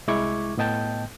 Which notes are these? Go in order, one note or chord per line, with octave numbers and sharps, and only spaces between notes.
C2 G#3 E4 C#6 D6 G#6
A2 B3 D#5 G5 A5 G6